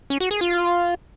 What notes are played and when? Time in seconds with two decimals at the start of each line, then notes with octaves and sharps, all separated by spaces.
0.10 C#4
0.21 F#4
0.31 G#4
0.41 F4